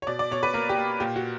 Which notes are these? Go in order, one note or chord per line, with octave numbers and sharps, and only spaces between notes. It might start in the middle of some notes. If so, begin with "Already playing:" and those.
C#5
B2 D5
D5
B2 C#5
B4
A#3 A#4
G4
A#3
A#2 G4
F#4